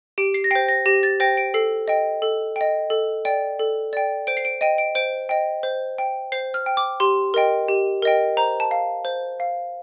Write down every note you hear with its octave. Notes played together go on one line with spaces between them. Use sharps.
G4 D7
C7
A#6
C5 G5 C7
A#6
G4 A#6
A6
C5 G5 A#6
D7
A4 C7
D#5 G5
A4
D#5 G5
A4
D5 G5
A4
D5 G5
C5 D7
C7
D7
D#5 G5 D#7
D7
C5 D7
D#5 G5
C5
G5
C5 C7
F6
G5
D6
G4 C6
A#4 D#5 G5
G4
A#4 D#5 G5
C5 A#5
A5
F5
C5
F5